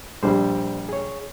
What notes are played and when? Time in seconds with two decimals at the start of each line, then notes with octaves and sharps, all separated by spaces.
0.23 A#1 G3 C5
0.89 G#4 C#5